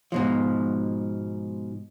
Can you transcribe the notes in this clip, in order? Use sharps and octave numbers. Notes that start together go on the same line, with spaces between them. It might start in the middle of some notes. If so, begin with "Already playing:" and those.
G#2 B2 F3